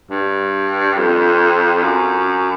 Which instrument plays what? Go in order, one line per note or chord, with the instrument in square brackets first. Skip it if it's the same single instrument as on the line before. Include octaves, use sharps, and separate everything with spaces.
[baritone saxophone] G2
F2
F#2